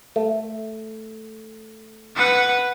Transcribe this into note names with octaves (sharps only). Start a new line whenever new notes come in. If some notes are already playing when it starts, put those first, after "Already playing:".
A3
B4 F#5